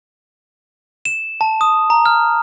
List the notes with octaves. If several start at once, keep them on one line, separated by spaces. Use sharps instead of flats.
E7
A5
D#6
A#5
F6